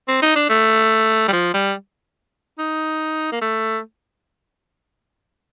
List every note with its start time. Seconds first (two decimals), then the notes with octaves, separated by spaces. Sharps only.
0.08 C4
0.22 D#4
0.36 D4
0.49 A3
1.28 G3
1.33 F3
1.54 G3
2.59 D#4
3.32 A#3
3.41 A3